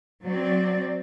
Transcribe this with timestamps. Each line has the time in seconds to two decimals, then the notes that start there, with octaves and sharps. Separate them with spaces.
0.25 F#3 C4 D5